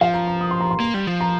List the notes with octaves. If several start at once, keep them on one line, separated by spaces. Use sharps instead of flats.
F3 F5
A#5
A#5
D#6
C6
A#5
C6
A#3
G3
F3
A#5